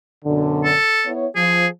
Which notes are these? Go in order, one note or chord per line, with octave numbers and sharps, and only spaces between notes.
F#2 B2 D3
A4
B3 E4 C#5
F3 G#4